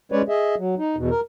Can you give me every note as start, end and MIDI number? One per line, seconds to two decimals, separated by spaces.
0.12 0.22 56
0.12 0.22 61
0.12 0.22 71
0.12 0.22 73
0.12 0.22 74
0.29 0.55 68
0.29 0.55 75
0.29 0.55 76
0.58 0.75 54
0.78 0.96 63
0.97 1.10 40
0.97 1.10 47
1.10 1.20 70